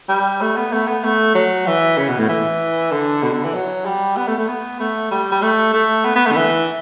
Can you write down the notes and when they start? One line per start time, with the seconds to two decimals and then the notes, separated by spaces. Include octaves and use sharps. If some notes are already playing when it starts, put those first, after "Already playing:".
0.09 G3
0.41 A3
0.56 B3
0.72 A3
0.87 B3
1.04 A3
1.35 F#3
1.67 E3
1.98 C#3
2.08 B2
2.18 A2
2.29 E3
2.92 D3
3.23 B2
3.33 D3
3.44 E3
3.54 F#3
3.85 G3
4.17 B3
4.28 A3
4.38 A3
4.48 B3
4.80 A3
5.11 G3
5.32 G3
5.42 A3
5.73 A3
6.05 B3
6.15 B3
6.26 A3
6.32 D3
6.36 E3